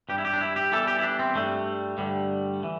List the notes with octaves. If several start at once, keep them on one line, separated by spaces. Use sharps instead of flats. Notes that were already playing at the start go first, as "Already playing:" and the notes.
G2 G3 G4
E4
G4
D4
E4
G4
E2 E3 G3 A4
G4
E4
D4
C4
G2 G3 A3
G2 D3 G3
E3